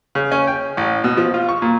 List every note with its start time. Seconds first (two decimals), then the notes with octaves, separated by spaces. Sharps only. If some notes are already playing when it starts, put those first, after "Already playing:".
0.15 C#3
0.32 C#4
0.47 G5
0.77 A1
1.04 B2
1.17 F3
1.34 F4
1.49 C#6
1.62 A#2